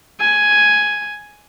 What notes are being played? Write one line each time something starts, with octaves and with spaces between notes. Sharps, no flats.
G#5